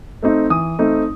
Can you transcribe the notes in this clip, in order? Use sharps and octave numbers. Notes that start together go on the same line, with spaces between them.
A3 C4 D#4
E3 D#6
A3 C4 D#4